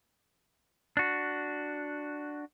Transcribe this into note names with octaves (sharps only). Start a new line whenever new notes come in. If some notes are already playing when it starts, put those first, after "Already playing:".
D4 F#4